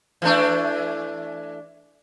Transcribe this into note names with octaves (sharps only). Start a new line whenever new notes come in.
E3 A3 D4